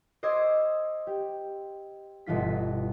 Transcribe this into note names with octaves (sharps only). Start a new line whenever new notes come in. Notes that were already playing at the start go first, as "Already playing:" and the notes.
C5 D#5 D6 E6 G#6 C7
G4
G1 B2 E3 F4 B6